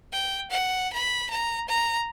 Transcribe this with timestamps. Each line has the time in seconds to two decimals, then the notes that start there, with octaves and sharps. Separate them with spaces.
0.12 G5
0.51 F#5
0.93 B5
1.30 A#5
1.69 A#5